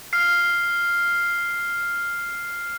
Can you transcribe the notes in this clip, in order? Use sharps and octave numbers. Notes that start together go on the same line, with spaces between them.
F6 C7